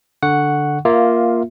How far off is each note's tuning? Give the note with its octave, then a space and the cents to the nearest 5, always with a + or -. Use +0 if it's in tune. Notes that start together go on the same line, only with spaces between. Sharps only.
D3 +0 F#5 +0 C#6 +0
A#3 +10 F4 +0 E5 +0